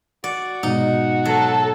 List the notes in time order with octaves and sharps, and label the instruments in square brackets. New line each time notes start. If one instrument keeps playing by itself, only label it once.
[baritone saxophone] F#4 [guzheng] D5
[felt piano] G#2 B2 [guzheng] D#4
[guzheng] F#3 [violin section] A4